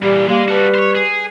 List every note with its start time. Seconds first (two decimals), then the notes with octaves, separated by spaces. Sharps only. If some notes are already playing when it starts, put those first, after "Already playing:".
0.03 A#2 E3 G3
0.28 G3 G#3 A#3
0.49 F#4 A4 B4
0.74 C5 C#5
0.95 G#4